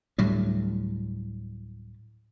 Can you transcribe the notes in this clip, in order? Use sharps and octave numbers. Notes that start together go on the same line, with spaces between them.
D2 A2 F#3 G3